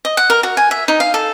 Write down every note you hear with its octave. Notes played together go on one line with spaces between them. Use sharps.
D#5
F#5
A#4
F#4
G#5
E5
D#4
F5
A4